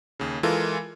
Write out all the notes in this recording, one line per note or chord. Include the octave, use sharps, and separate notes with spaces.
D#2 C#3
E3 G#3 F4 A4 A#4